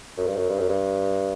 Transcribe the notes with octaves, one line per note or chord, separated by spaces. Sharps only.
F#2
G2
F#2
G2
F#2
G2